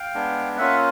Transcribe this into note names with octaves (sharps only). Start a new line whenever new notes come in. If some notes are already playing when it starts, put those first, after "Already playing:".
Already playing: F5 G5
G#3 B3 D4
A#3 C#4 F4 E5 F#5